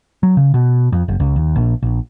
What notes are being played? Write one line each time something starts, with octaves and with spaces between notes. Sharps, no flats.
F#3
C#3
B2
F2
F#1
C#2
D#2
A#1
A#1